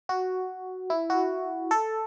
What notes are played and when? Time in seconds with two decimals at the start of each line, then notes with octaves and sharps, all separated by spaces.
0.09 F#4
0.90 E4
1.10 F#4
1.71 A4